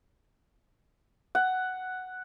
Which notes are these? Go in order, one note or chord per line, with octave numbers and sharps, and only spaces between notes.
F#5